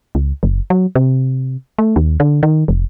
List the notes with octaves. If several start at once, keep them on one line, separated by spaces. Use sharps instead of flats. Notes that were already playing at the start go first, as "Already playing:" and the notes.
C#2
F#1
F#3
C3
A3
D#2
D3
D#3
F1